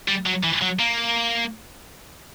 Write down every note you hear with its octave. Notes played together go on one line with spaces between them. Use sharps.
G3
F#3
E3
F#3
A#3